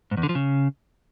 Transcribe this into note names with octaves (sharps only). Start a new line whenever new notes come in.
G#2
E2
D3
F3
C#3